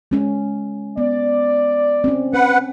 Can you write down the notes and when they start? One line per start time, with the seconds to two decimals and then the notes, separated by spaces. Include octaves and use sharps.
0.11 G#3 C#4
0.98 B3 D5
2.04 C4 C#4
2.33 C#4 B4 F#5